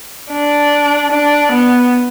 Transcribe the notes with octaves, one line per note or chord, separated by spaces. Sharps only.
D4
D4
B3